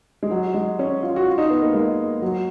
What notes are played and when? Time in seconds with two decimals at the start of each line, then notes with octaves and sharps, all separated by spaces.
0.23 G#3
0.31 F#3
0.54 G#3
0.79 C#4
1.03 F4
1.16 F#4
1.26 F4
1.38 D#4
1.50 B3
1.62 A#3
1.74 G#3
2.22 F#3